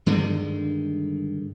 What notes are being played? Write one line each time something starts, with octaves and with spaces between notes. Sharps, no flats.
G2 D3 D#3 G#3